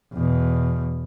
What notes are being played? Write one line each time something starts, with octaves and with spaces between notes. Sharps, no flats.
E2 B2